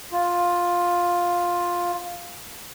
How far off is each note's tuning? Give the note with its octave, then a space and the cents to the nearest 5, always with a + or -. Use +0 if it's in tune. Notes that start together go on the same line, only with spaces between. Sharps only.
F4 +10